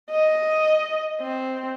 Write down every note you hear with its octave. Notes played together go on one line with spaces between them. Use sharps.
D#5
C4